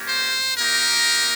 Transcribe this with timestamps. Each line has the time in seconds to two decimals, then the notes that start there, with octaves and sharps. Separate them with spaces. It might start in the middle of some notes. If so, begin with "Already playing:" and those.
Already playing: A#3 C#4 G4
0.08 C5
0.57 A#3 D#4 G4 A#4